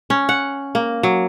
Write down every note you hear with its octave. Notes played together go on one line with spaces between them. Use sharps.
C#4
F#5
A#3
F#3